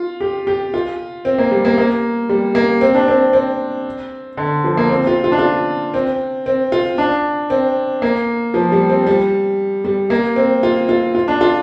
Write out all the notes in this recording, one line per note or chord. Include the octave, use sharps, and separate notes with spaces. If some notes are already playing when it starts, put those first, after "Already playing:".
Already playing: F4
G4
G4
F4
C4
A#3
G3
A#3
A#3
G3
A#3
C4
D4
C4
C4
D3
F3
A#3
C4
F4
F4
D4
F4
C4
C4
F4
D4
C4
A#3
F3
G3
C4
G3
G3
A#3
C4
F4
F4
F4
D4
F4